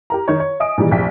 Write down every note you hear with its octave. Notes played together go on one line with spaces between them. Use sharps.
G4 A#4 A#5
D#3 A#4 C#5
C#5
D#5 E5 G#5 D#6 D7
A#2 D#3 E3 G3 G#3
F1 A#1 C3 E5 G5 B6